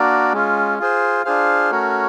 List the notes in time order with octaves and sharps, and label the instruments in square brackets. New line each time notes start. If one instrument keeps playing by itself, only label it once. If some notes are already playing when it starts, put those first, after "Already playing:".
Already playing: [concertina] A#3 D4 F#4 A#4 D5
G#3 C#4 F4
F4 G#4 C5
D4 F4 G#4 C5 F5
A3 C#4 F#4 A#4 C#5